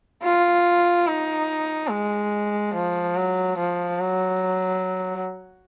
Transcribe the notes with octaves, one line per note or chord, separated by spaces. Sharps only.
F4
D#4
G#3
F3
F#3
F3
F#3